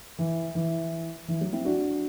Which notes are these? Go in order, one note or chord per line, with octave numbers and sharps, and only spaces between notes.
E3
E3
E3
F#3
C4 E4
D4 F#4